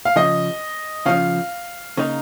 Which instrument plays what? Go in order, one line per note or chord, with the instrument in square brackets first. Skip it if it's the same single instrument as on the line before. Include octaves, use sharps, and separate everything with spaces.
[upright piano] F5
[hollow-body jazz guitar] C#3 F3 C#4 [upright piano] D#5
[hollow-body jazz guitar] C#3 F3 C#4 [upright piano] F5
[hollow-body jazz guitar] C#3 A#3 D#4